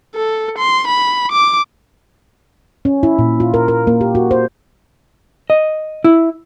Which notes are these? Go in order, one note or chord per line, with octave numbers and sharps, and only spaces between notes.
A4
C6
B5
D6
C#4
E4
A#2
F4
A#4
A#4
A#3
G4
F#4
C5
D#5
E4